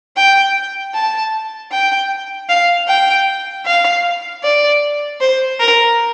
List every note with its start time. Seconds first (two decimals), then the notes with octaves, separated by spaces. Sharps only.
0.17 G5
0.94 A5
1.72 G5
2.49 F5
2.88 G5
3.66 F5
4.44 D5
5.21 C5
5.60 A#4